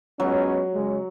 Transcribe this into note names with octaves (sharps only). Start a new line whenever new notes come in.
F#3 G#3 B3 C#4
C#3 G#3